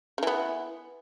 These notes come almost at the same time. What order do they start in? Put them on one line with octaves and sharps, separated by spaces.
C#3 E3 B3